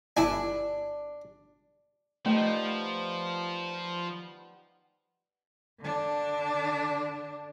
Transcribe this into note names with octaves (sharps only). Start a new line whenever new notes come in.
G1 D4 E4 G#5
F3 G3 A3 B3 D#4
D3 D4